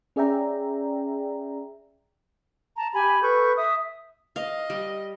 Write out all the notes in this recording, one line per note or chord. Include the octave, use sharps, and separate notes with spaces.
C#4 G#4 D5 E5 G5 A#5
A5 A#5
G4 G#5 B5
A4 B4 C#6 G6
E5 D#6
D#5 F5
G3